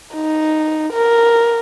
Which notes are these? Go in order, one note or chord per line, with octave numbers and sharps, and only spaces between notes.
D#4
A#4